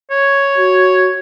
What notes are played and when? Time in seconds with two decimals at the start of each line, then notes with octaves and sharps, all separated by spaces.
0.11 C#5
0.58 F#4